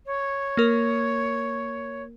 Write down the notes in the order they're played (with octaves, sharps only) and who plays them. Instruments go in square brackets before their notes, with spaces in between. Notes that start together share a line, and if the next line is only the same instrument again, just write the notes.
[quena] C#5
[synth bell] A#3 A#4